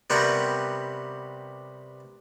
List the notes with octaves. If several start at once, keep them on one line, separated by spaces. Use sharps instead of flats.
C3 G3 B3 A#4 F#5 C#6